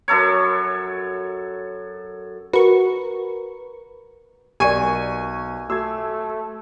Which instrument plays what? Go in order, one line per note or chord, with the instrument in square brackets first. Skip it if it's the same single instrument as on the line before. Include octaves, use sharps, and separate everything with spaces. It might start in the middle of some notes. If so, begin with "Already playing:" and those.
[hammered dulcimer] F#2 A4 C#5
[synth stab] F#4 C#6 [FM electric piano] A#4 B4
[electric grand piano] B1 C#6 D#7 [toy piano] G4 A#4 D5 [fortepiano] G#5
[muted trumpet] A3 [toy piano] F4 F#4 D6 [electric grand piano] E6 G#6